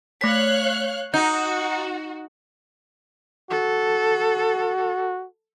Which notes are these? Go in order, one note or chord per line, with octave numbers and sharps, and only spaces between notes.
A3 C#5 F5 F#6 B6
D#4 F#4 G6
F#4 A4